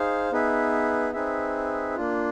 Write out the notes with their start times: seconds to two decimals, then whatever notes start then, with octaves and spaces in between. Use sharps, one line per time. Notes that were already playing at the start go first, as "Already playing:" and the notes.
Already playing: D#4 G#4 C5 F5
0.32 B3 D#4 G#4 B4 E5
1.13 C4 D#4 G#4 B4 E5
1.96 A#3 D4 F4